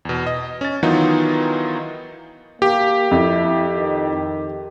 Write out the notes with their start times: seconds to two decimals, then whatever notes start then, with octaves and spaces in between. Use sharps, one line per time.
0.05 E2 B2
0.27 D#5
0.61 C#4 A6
0.83 D#3 E3 F#3 B3 D#4 F4
2.62 A#3 G4
3.11 F2 E4
3.76 D#3